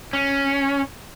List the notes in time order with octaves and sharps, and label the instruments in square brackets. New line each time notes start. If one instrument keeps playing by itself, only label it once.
[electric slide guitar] C#4